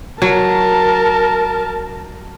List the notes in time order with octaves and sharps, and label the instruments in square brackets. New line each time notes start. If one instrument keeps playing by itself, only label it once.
[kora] F#3 [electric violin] A#4 A5